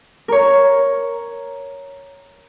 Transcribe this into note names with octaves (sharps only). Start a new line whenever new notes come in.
A#4 C#5